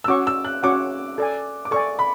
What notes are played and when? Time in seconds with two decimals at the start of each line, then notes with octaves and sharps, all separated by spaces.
0.04 E6
0.08 C#4 F#4 C#5 F#5 C#6 D6
0.27 E6
0.45 F#6
0.63 C#4 F#4 C#5 F#5 C#6 D6
1.18 A4 D5 G#5
1.65 D6
1.71 A4 D5 G#5 C#6
1.99 B5